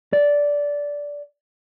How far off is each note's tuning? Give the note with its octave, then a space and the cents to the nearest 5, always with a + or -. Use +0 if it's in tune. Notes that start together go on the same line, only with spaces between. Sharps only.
D5 -15